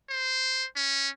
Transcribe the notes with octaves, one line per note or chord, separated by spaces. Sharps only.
C5
C#4